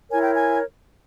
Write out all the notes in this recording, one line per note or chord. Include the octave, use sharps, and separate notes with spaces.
E4 A#4 C#5 G#5
G5
G#5